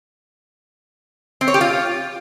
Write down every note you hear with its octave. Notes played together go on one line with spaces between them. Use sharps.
C4
C#5
G4
F4